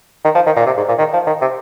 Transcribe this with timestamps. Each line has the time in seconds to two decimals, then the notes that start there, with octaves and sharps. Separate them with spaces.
0.24 D#3
0.35 F3
0.46 D#3
0.56 A#2
0.66 C3
0.77 G#2
0.88 A#2
0.99 D#3
1.13 F3
1.27 D#3
1.41 C3